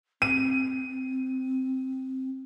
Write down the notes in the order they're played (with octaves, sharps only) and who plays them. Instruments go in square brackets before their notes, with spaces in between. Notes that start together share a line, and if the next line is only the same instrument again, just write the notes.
[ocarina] C4 [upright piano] D#7